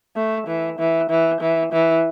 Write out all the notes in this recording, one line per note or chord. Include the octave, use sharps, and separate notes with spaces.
A3
E3
E3
E3
E3
E3